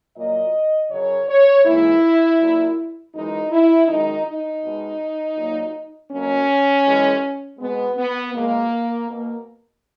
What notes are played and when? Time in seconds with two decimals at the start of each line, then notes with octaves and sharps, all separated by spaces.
0.17 A#2 F#3 A#3 D#5
0.91 F#2 C#3 F#3 C#5
1.28 C#5
1.65 G#2 E3 A#3 E4
2.39 A#2 F#3 A#3
3.14 F#2 E3 G#3 D#4
3.51 E4
3.87 F#2 D#3 G#3 D#4
4.25 D#4
4.62 B2 G#3
5.37 A#2 F#3 A#3
6.10 B2 F#3 A#3 C#4
6.85 F#2 C#3 E3 G#3
7.59 B2 G#3 B3
7.97 B3
8.33 E2 B2 G#3 A#3
9.07 B2 A#3